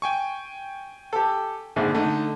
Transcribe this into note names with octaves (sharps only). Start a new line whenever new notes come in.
G5 G#5 C#6
G4 A4
A#1 G#2 D3
D3 A3 D#4